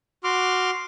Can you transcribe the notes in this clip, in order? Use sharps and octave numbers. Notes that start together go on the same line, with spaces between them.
F#4 C6 D6 F6